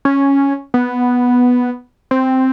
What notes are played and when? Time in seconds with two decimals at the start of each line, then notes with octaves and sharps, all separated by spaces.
0.05 C#4
0.74 B3
2.11 C4